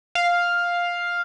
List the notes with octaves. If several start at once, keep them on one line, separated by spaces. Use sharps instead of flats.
F5